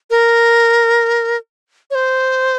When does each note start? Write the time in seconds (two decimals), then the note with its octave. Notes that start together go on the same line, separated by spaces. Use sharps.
0.10 A#4
1.91 C#5
1.95 C5